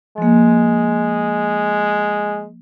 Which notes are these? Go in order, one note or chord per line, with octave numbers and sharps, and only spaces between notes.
F3 G#3 A#3